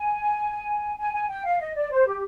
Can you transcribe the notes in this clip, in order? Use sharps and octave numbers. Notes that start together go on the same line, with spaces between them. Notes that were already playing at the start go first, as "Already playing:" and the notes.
Already playing: G#5
G#5
G#5
G5
F5
D#5
D5
C5
G4